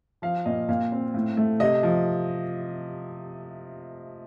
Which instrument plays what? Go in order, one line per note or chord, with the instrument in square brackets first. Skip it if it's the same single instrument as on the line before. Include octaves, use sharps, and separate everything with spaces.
[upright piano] F3 F5
A#2 D#5
A#2 F5
C4
A2
A3
C3 D#5
F3